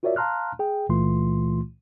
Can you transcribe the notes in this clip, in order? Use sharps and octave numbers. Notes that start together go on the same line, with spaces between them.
F4 F#4 A#4 C#5 D5 E5
F5 A5 A#5 C6 F6 F#6
G#4 G5
C#2 A#2 E3 A3 F4 C6